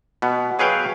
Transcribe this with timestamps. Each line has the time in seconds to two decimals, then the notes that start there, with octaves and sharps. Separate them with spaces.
0.22 B2 B3
0.59 F#3 G#4 B4 C#5 F5 G5